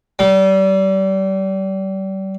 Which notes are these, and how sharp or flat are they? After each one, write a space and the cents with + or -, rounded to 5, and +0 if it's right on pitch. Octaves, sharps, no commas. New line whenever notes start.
G3 -35